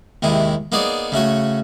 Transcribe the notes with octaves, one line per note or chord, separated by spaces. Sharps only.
D#2 C3 D#3 G#3 E4
A#3 B3 D#4 G#4 C#5 D5
C#3 A3 F#4 C#5